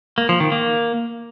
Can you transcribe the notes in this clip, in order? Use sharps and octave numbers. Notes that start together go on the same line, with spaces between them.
A#3
F3
D#3
A#3